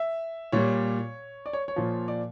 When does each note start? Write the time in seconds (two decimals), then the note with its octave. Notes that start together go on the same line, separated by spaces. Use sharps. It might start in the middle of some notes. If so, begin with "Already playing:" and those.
Already playing: E5
0.52 A#2 G3 C#5
1.46 D5
1.53 C#5
1.68 C#5
1.76 A#2 F3
2.08 D5